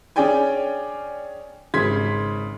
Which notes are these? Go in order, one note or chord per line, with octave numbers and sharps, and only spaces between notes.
C#4 D4 G#4 D5 G5 G#5
G#1 C#3 C6 G#6 B6